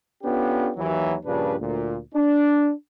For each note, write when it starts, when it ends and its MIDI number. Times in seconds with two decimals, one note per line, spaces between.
0.22 0.69 59
0.22 0.69 61
0.22 0.69 62
0.22 0.69 65
0.22 0.69 67
0.22 0.69 69
0.76 1.15 39
0.76 1.15 52
0.76 1.15 54
1.24 1.54 43
1.24 1.54 46
1.24 1.54 49
1.24 1.54 53
1.24 1.54 62
1.24 1.54 71
1.59 1.96 38
1.59 1.96 46
2.14 2.71 62